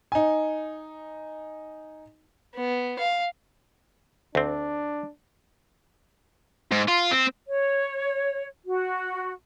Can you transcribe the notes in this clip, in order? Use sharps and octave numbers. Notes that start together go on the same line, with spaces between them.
D#4 G#5
B3
F5
D2 C4 D4
G#2
F4
C4
C#5
F#4